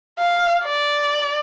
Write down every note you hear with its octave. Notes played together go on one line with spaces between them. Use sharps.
F5
D5